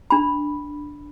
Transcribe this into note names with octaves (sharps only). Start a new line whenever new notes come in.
D4 B5